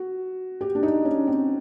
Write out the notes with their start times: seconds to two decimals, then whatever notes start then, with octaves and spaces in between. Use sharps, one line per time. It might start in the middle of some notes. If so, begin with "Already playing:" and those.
Already playing: F#4
0.61 G4
0.75 D4
0.83 D#4
1.05 C#4
1.27 C4